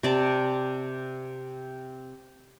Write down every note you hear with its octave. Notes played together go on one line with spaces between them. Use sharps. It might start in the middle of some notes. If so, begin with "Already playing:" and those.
C3 D5 A5